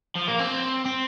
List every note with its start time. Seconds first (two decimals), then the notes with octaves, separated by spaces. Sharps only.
0.16 F3
0.28 A#3
0.40 C4
0.85 C4